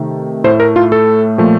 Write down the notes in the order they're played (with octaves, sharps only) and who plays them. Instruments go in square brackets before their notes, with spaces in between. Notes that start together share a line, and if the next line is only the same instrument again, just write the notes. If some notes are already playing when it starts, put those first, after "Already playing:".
Already playing: [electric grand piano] C3 D#3 A3
A2 A3 C5
A#4
F4
A4
A#2 F3 A3